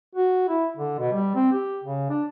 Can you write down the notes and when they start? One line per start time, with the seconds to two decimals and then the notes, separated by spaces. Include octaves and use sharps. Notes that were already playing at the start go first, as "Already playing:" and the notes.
0.15 F#4
0.48 E4
0.77 D3
0.98 B2
1.13 G3
1.35 C4
1.52 G4
1.84 C#3
2.10 D4